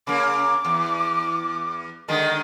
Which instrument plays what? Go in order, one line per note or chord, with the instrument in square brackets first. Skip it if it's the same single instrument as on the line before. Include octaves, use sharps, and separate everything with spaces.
[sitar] C#3 A#3 [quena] D6
[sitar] E2
[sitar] D3 D#3 G#3 [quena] D#5